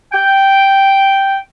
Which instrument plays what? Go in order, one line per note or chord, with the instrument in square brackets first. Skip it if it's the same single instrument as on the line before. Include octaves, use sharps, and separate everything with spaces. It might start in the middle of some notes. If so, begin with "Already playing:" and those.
[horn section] G5